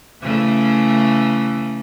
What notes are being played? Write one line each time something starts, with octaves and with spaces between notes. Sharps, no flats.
C#3 E3 A3